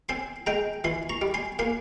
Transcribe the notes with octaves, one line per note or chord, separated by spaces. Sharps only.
C4 G#5 C6
G#3 G5 A#5
E3 G#5 C6
A#5 C#6
G3
G#5 C6
A#3 G#5 C6